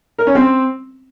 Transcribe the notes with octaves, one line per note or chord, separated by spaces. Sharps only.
A#4
C#4
C4